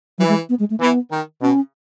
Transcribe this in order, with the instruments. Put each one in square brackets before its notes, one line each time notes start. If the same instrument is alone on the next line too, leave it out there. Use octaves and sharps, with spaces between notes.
[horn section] E3 [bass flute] F#3
[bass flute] G#3
B3
G#3
A3
[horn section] E3 [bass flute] B3
[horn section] D#3
[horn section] B2 [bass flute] C#4